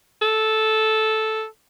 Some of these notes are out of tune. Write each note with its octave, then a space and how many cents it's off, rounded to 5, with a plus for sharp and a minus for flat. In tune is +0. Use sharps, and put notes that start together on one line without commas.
A4 -10